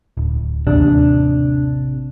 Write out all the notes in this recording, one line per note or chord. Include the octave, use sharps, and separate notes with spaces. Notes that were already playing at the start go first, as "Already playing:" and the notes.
D1
A1 D#2 C3 D4